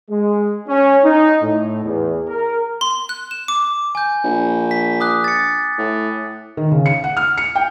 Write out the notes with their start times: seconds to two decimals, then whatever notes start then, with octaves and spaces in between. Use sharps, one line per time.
0.10 G#3
0.68 C#4
1.04 D#4
1.42 A2
1.84 E2
2.28 A#4
2.81 C6
3.09 F#6
3.31 E7
3.48 D6
3.95 G#5 G6
4.24 A#1
4.71 B6
5.00 D6 D#6 F#6
5.24 A6 C#7
5.78 A2
6.57 D#3
6.71 C#3
6.86 C#7
7.04 F#5
7.17 F6
7.38 C#7
7.55 G5